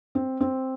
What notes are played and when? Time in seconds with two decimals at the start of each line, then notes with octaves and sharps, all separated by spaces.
0.15 C4
0.41 C4